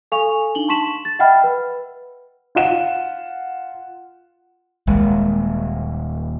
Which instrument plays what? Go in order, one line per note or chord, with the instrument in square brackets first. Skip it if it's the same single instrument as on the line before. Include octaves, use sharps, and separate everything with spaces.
[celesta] A4 F5 G#5 C#6 F7
D4 D#4 F#7 G7
A5 C6 C#6 B6 E7 F#7
A6
D#5 E5 F#5 G5 B5 F6
B4
[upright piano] F4 F5 F#5 E7
[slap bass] D#1 [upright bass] G#3